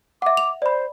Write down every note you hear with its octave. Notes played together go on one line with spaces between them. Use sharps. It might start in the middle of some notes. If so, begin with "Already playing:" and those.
E5 F#5 D6
F7
C5 D5 B5